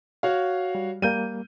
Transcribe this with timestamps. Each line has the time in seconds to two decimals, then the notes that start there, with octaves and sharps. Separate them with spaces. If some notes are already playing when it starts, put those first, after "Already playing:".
0.23 F#4 C#5 F5
0.75 G3
1.02 G3 A#3 G6 D#7